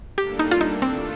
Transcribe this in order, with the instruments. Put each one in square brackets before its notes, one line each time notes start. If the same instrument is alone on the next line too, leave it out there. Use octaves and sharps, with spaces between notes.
[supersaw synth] A2 G3 A#3 D4 A4 [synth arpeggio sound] G4
[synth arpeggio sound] D#4
F4
D#4
[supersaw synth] D#3 A3 D4 F4 A4 [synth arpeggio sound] C4